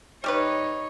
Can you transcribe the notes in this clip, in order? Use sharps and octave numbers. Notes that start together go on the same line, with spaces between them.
G3 D#4 G4 B4 C#5